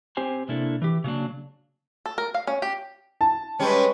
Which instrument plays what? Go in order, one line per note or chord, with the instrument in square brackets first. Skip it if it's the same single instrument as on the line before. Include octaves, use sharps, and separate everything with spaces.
[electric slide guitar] C4 G4 C5 G#5
C3 A#3 D4 E4 A4
E3 G4
C#3 F#3 A#3 D4
[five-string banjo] A4
A#4
F5
C#4
G4
[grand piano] A5
[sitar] G3 C#4 [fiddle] G#3 B4